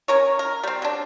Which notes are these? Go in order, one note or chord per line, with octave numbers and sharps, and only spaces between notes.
C#4 A#4 C#5
A#4
G3 C4
F#3 D4